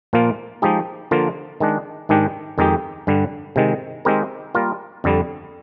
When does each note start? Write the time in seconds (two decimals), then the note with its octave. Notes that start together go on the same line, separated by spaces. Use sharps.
0.13 A#2 F3 A#3 F4
0.62 F3 G#3 D#4 G4
1.11 D3 F3 A#3 F4 A#4
1.60 D#3 G#3 D4
2.09 G#2 D#3 G#3 D4 G4
2.58 F2 D#3 G#3 D#4 G4
3.07 G2 D3 G3
3.56 C3 D#3 G#3
4.05 D#3 G#3 C4 G4 A#4
4.55 G3 A#3 F4 A#4
5.04 F2 D3 G3